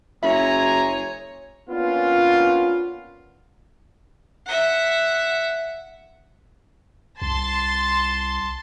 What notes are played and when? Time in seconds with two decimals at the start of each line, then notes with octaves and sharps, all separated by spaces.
0.23 F#1 G#3 C#5 E5 G#5 A#5
1.69 A#3 B3 C#4 D4 F4
4.46 E5 F#5
7.22 C2 A5 C6 A6